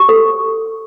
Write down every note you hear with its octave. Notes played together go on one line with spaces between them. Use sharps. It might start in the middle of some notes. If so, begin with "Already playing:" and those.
Already playing: G4
A4